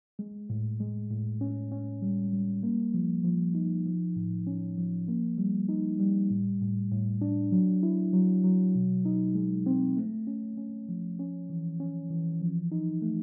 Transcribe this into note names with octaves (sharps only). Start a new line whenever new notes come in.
G#3
A2
G#3
A2
C#4
C#4
G3
G3
A#3
F3
F3
D#4
F3
A2
C#4
F3
A#3
G3
D#4
G3
A2
A2
A2
D4
F#3
E4
F#3
F#3
B2
D#4
G#3
C4
A3
C#4
C#4
F3
C#4
E3
C#4
E3
F3
D#4
A3